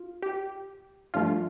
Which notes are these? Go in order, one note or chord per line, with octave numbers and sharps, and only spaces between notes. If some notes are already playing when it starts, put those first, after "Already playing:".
Already playing: F4
G4
G2 F3 A3 F4